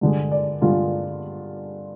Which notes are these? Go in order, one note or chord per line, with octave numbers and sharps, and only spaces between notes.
G2 D3 G#3
D5
G2 D3 G#3 F4